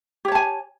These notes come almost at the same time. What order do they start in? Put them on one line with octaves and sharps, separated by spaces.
G4 C#5 A5 G#5